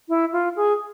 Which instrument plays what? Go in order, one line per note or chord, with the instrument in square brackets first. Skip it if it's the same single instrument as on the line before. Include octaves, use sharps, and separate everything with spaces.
[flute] E4
F4
G#4